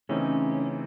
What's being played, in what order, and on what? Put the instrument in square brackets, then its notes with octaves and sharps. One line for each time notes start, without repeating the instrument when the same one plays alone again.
[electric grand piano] C#3 E3 A3 C4 D#4 [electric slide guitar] C#4